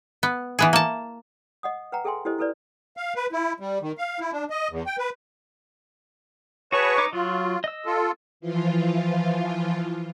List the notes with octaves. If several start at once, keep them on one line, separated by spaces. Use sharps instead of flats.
B3
E3 B3 G#4
A#3 A5
D#5 F#5 D#6
B4 F#5 G5 A#5
G#4 A4 E5 G5 G#5 C6
E4 G4 A4 C5 D#5
E4 A4 B4 D5
F5
B4
E4
G3
D#3
F5
E4
D4
D#5
E2
G5
B4
F#4 G#4 B4 C#5 A5 C#6
D#4 D6
F#3 F4
D#5 E6
F4 A4
E3 F3 F4